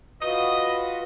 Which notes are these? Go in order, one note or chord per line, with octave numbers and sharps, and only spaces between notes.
F4 F#4 B4 D#5